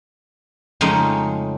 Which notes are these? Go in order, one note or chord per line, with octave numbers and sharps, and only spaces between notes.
F2 C#3 G#3 A3 C#4 D#4